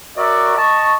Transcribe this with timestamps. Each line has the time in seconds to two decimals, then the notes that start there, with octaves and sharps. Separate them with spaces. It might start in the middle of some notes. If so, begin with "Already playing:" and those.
0.17 F#4 A#4 C#5 D5 E5
0.57 D#5 A5 C#6